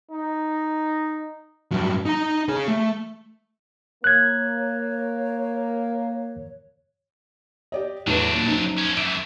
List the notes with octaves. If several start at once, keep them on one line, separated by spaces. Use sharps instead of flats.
D#4
G2 F#3
D#4 A#5
G#4 C#5
A3
A#3 C#5 F#6 G#6
G4 D5 D#5
E2 A2 F#3 D4 B4
A#2
F#1 D#4
F3 C#4
F#2 E3 D7 E7